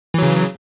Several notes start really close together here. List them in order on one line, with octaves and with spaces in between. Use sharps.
E3 F#3 C#3